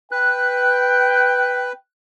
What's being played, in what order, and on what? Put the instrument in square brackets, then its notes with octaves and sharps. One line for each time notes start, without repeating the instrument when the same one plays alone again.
[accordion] B4 [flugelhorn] G5 [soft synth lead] F#6